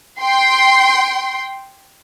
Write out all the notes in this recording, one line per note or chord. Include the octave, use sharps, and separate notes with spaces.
G5 C6